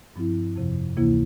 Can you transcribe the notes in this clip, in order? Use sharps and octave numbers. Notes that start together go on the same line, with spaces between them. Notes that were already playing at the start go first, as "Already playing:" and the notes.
G2 F3 C4 E4
F2 C3 F3
D2 C3 E3 A#3 E4